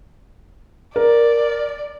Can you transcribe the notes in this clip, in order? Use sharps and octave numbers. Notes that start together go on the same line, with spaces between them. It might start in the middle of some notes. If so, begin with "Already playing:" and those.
A#4 D5